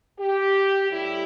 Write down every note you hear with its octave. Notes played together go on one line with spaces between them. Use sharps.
G4
A2 G3 E4